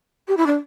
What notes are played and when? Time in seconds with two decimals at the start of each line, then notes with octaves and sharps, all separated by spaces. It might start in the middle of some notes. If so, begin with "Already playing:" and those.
0.28 G4
0.37 E4
0.47 D4